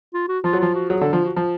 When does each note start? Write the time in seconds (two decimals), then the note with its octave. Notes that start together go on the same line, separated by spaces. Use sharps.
0.14 F4
0.29 F#4
0.44 F3 F4
0.53 F#3
0.59 F3 F4
0.75 F#4
0.90 F#3 G#4
1.01 D3 A4
1.13 F3 F4
1.25 F#4
1.36 F3